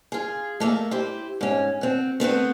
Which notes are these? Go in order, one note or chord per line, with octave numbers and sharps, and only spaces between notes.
F4 G#4
A3 A#3 D5 E5
E4 G4 C5
G#2 C#4
C4 F#4
A3 B3 C4 B4